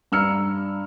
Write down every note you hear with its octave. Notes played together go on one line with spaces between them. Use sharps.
G2 A#5 E6 F6 C#7